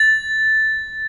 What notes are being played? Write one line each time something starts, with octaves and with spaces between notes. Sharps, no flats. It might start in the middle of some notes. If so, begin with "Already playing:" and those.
Already playing: A6